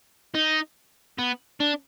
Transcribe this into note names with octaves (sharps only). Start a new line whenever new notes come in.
D#4
B3
D4